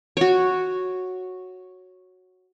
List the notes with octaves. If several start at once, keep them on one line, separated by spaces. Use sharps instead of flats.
F#4 C#5